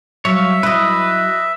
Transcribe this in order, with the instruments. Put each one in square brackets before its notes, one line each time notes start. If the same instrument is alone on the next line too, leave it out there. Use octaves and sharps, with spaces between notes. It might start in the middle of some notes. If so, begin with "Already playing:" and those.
[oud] F#3 [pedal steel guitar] C#5 F5 [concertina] E5
[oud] F#3 E4 [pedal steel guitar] B4 D#5